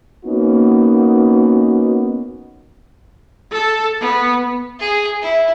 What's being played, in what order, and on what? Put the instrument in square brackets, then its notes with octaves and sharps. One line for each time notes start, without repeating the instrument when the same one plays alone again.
[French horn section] A#3 B3 C#4 D#4 F#4
[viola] A4
B3
[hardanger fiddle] G#4
E4